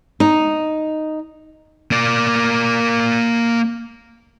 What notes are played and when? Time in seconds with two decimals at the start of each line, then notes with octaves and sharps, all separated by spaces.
0.20 D#4
1.91 A#3 D5